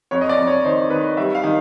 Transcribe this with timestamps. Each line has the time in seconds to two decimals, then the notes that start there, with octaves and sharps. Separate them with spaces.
0.11 F2 C#5
0.21 D#5
0.29 D5
0.37 F2
0.47 C#5
0.65 D#3 C5
0.90 D#3 B4
1.17 G3 E5
1.35 F5
1.44 D#3